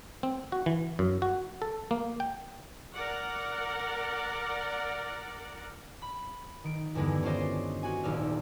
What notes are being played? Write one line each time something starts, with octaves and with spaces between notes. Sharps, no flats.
C4
F#4
E3
F#2
F#4
A4
A#3
G5
A#4 D5 F#5
B5
D#3 D7
E2 G2 D3 G#3 B3
C#4 D4 F4 C5 D5 D#5
F#4 G#5
D#1 G#1 A4 D5 F6